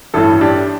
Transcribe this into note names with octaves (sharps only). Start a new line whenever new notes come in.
A1 G2 E3 E4 A4
D4 G4